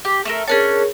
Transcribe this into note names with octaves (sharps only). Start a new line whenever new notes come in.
G4
A3 A4 A#4
C#4 D4 G#4 A#4 C#5 A5